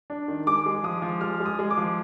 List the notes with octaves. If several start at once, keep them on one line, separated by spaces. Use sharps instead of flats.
D4
D#3
G#3 D6
G#3
F3 D#6
F3
G#3 F6
G#3
D#6
G#3
D6
F3